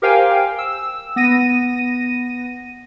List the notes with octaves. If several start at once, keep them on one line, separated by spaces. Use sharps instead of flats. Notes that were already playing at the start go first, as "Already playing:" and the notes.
G4 A#4 C5 F5 G5 G#5
E6
B3 A#6 D#7